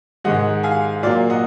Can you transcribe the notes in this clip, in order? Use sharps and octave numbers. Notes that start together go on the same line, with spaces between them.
G#2 D#3 G#3 D#5 F#5
F5 G#5
A#2 F#3 A#3 D5 F5
D#5 F#5